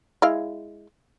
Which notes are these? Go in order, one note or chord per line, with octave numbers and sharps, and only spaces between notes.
G#3 E4 F5